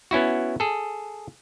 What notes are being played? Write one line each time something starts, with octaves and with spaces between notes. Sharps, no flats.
B3 C#4 E4 F#4
G#4 A4